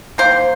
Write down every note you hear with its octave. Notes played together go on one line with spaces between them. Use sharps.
D#3 A#3 C5